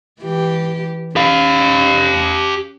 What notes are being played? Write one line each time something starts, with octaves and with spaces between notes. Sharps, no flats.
E3 G4
C#4 G4 F5